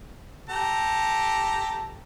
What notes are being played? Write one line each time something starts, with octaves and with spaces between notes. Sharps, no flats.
G4 A4 A#5